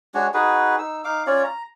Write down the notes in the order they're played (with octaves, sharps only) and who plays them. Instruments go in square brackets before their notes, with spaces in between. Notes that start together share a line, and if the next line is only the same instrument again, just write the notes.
[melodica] G#3 D4 F#4 C#5
D#4 F#4 G#4 B4
D#4 E6
D#4 F5 D6
C#4 F4 C#5 D5
A#5